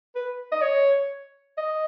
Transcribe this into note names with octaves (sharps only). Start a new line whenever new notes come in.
B4
D#5
C#5
D#5